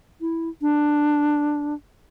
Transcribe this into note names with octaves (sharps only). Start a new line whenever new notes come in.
E4
D4